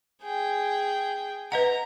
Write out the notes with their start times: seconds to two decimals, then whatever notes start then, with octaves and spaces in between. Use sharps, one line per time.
0.22 G#4 G5
1.52 B4 D#5 F#5 A#5